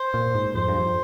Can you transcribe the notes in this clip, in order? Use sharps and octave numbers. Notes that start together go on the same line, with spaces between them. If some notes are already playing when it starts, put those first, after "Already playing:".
Already playing: C5
A#2
G#2
F2 C5
G2
F2